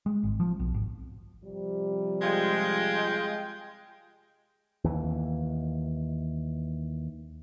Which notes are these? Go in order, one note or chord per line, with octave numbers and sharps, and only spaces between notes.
G#3
G#1
F3
B1
G#1
C3 F3 G3
G#3 F4 G5
D#2 E3